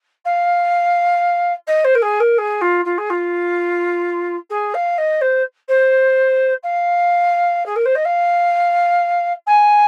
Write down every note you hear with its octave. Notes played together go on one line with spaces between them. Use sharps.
F5
D#5
C5
A#4
G#4
A#4
G#4
F4
F4
G#4
F4
G#4
F5
D#5
C5
C5
F5
G#4
A#4
C5
D#5
F5
G#5